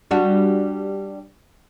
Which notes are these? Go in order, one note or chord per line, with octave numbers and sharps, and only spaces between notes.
G3 D4 F#4